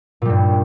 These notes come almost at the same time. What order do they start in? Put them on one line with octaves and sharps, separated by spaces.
A#2 G3 G2